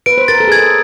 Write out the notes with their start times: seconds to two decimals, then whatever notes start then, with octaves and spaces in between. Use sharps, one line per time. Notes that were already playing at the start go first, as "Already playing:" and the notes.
0.06 B4 D7
0.18 C5
0.28 A#4 A6
0.40 A4
0.48 G#4
0.52 A4 G#6